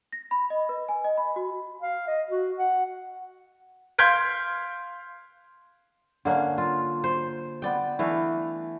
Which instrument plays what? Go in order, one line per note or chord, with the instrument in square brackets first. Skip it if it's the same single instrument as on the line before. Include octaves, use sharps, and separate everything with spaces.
[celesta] A#6
B5
D#5
B4
G#5
D#5
B5
F#4
[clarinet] F5
D#5
F#4
F#5
[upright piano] F5 C6 G6 G#6 B6 D7
[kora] D3 A#3 C#4
F4
C5
B3 D5 G5
E3 A3 D4 F5